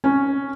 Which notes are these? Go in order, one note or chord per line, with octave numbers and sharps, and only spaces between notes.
C#4